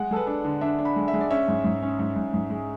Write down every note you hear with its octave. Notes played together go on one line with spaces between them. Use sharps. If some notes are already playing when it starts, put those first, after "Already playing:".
Already playing: G#3 F#5
G#3 A4
B4
D4
D3
D4 E5
D4
B5
G#3
E5
G#3
D5
C#4 E5
G#2
G#2
C#4
G#2
G#2
G#2
G#3